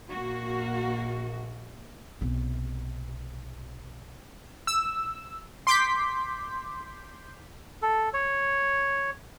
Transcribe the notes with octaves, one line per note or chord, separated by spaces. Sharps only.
A#1 A#2 A#3 F#4
B1 C3
E6
C6 D6 G6 B6
A4
C#5